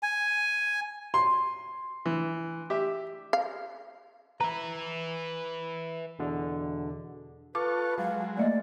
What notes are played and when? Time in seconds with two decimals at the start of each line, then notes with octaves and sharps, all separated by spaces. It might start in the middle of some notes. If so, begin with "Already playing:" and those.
0.03 G#5
1.14 C6
2.06 E3
2.70 G4 E5 D6
3.33 F5
4.41 B4 E5 A#5
6.19 E2 B2 D3
7.55 F4 A4 B4 C#6 D6
7.98 F#3 G#3 F5
8.37 A3 A#3 D5 D#5